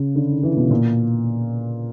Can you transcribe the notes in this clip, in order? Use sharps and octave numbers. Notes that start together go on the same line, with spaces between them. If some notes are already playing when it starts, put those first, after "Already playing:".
Already playing: C#3
D3
D#3
E3
B2
A#2